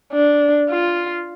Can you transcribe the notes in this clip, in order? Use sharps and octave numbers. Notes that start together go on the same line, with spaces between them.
D4
F4